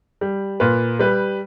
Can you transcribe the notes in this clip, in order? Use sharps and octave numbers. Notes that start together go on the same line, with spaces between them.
G3
A#2 B4
G3 B4